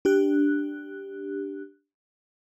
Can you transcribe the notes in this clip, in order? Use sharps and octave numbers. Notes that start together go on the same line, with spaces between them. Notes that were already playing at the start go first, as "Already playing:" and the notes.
D4 G4 F#6